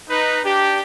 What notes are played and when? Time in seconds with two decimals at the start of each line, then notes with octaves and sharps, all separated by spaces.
0.10 D#4 B4
0.45 D4 G4